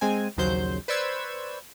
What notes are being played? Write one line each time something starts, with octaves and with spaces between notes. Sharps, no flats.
G#3 C4 G#5
A#1 D#2 C#3 F#3 C5 G6
B4 C5 D5 C#6 E6 G#6